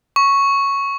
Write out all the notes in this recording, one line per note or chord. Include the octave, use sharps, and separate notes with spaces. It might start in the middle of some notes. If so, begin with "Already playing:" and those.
C#6